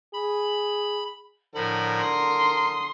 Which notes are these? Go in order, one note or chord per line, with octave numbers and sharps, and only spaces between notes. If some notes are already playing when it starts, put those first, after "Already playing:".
G#4 B5
A2 D3 F3 A#4 B5
C6 D#6